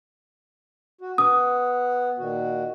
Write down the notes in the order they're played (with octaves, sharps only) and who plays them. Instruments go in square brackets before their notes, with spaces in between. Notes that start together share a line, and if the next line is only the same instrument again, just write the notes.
[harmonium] F#4
[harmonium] B3 F#5 [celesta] D#6
[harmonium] A#2 D#3 F#4